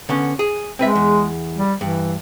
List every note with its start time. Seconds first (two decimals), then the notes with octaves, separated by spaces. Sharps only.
0.09 D3 B3 C#4
0.39 G#4
0.79 G#3 C4 B4 E5
0.95 E2
1.56 G3
1.81 G2 E3